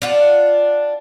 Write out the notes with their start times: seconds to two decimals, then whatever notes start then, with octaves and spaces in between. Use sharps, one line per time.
0.02 D4 F4 F#5